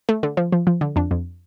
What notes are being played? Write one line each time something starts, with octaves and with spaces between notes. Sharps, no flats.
A3
D3
F3
F3
F3
D3
F2 D4
F2